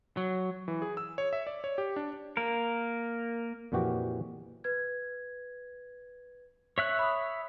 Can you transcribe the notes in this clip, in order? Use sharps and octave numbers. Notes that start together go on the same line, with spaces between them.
F#3
E3
G#4
E6
C#5
E5
D5
C#5
G4
D4
A#3 A#4
F2 A#2 E3 F#4 G4
B4 G#6
C#5 E5 F#6
B5 D#6